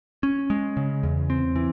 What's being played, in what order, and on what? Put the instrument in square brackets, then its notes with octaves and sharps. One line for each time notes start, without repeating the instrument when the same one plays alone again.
[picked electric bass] C#4
G#3
C#3
E2
C4
E3